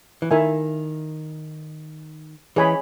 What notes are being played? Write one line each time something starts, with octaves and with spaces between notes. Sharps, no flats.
E3
D#3 E4 A#4 E5 G#5
E3 G#4 C#5 G#5 B5